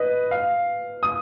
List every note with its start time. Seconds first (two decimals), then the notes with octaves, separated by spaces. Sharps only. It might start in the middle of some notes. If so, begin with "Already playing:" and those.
Already playing: B4 D#5
0.31 F5
1.03 D#6